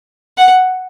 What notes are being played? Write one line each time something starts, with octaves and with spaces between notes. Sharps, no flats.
F#5